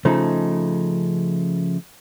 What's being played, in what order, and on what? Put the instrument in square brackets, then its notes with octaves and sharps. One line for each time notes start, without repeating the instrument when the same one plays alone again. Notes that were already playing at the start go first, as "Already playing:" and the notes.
[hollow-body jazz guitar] C#3 F3 A3 D#4